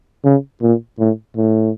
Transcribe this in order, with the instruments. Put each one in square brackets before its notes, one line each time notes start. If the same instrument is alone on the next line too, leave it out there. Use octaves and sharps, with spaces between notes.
[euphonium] C#3
A#2
A2
A2